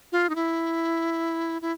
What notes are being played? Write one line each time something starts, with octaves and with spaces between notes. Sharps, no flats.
F4
D#4
E4
E4